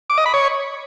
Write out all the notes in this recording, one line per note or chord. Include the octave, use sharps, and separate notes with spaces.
D6
D#5
B5
C#5